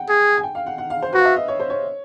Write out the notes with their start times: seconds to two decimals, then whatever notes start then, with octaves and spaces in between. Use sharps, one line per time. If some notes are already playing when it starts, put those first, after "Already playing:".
Already playing: F#5 G5
0.09 G#4
0.37 G#5
0.43 G5
0.55 F5
0.66 F#5
0.78 F#5
0.90 F5
1.02 C5
1.13 F#4 B4
1.20 F5
1.25 E5
1.36 D#5
1.48 C#5
1.60 C5
1.70 C#5